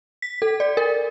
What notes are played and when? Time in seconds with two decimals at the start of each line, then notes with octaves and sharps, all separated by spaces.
0.22 B6
0.42 A4
0.60 D5
0.77 A#4